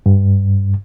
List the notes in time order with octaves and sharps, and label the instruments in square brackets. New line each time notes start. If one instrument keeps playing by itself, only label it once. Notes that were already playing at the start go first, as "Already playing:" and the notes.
[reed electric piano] G2